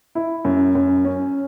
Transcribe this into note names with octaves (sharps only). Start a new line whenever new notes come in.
E4
F#2
F#2
C#4